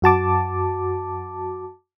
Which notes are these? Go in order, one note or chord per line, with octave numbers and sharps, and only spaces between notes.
F#2 F#4 A5 D6